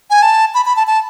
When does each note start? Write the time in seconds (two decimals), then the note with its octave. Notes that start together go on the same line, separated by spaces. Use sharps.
0.10 G#5
0.22 A5
0.54 B5
0.65 B5
0.76 A5
0.87 A5